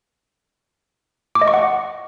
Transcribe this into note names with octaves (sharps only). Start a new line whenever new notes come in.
D6
D#5
C#6
F#5